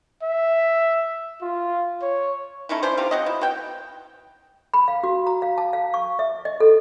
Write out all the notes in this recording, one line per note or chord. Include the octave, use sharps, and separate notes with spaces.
E5
F4
C#5
A3 C#4 D#4 E4
C#4 D4 E4 C5
G3 C4 D#4 F4
F#3 C4 D#5
E4
B2 G5
B5
F5
F#4
A#5
F5
A5
F5
C#6
E5
D#5
A4